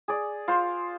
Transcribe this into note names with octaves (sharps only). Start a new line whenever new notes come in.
G#4 D5
F4 C5